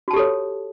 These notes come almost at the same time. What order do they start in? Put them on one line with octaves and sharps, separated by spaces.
F#4 A5 G4 A4 C#5